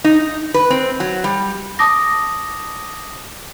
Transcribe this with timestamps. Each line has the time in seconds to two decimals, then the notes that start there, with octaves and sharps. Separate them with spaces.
0.04 D#4
0.54 B4
0.70 C4
1.00 F#3
1.24 G3
1.79 A5 D6 D#6 A#6